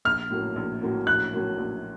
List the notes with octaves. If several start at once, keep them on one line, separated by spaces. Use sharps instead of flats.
A#1 F6
A2 F#3 A#3 C#4
A#1
A2 F#3 A#3 C#4
A#1 F#6
A2 F#3 A#3 C#4
A#1